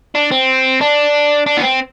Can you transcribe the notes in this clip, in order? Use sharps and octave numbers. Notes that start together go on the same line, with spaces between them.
D4
C4
D4
D4
B3
C4